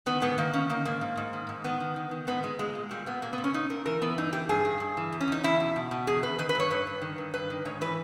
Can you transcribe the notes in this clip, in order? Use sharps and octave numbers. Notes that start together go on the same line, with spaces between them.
D#3 B3
G#2 B3
D#3 A#3
D#3 C#4
D#3 A#3
G#2 A#3
G#2
G#2
D#3
G#2
D#3 B3
D#3
D#3
D#3
G#2 B3
G#2 G#3
A#2 G#3
A#2
A#2 G3
A#2 B3
A#2 A#3
B3
A#2
C#4
A#2 D#4
A#2 A#4
E3 A#4
E3 B3
G2 D#4
E3 G4
G2 G#4
G2
G2
E3
E2
C#4
E2 D#4
E2 E4
B2
B2
B2
E2 G#4
E2 B4
D#3 B4
B4
G2 C#5
G2 B4
G2
D#3
G2
G2 B4
D#3
G#2 C#5
E3 B4